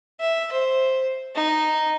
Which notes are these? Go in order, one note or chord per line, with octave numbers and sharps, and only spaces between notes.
E5
C5
D#4